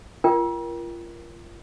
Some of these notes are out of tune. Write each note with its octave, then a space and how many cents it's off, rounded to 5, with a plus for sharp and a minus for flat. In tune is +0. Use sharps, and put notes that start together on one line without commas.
F4 -30 A#4 +20 G5 +0